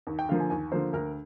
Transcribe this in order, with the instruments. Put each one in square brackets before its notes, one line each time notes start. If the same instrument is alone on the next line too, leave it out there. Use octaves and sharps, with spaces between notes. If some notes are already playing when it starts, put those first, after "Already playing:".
[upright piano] D#2
G5
D3 F3 A#3 F5
G#5
D#2 G#5
D3 F3 A#3 C5
D2 A#4